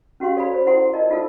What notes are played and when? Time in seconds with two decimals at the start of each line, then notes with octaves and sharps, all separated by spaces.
0.20 C#4 F#4 G4 F5 C6
0.36 A4 C#5 D5 F5 G#5 B5
0.54 C5
0.66 E4 A4 C5 F#5 G#5 C6
0.93 F4 A#4 D5 D#5 A5
1.10 D#4 F4 A4 E5 E6